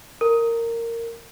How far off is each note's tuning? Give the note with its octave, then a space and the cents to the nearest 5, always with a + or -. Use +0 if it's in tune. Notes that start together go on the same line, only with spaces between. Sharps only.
A#4 -15